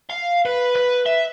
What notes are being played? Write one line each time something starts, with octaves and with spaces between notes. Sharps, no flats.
F5
B4
B4
E5